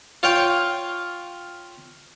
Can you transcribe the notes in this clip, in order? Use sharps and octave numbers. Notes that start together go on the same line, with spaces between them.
F4 C#5 F5 G5